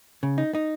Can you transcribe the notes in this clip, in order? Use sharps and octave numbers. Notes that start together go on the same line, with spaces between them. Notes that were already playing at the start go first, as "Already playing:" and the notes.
C#3
D#4
D#4